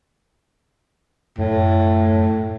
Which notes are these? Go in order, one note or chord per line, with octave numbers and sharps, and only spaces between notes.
F#2 A2